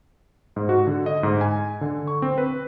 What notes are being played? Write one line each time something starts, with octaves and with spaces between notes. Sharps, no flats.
G#2
F#4
D3
D#5
G#2
G#5
D3
C#6
C4
B4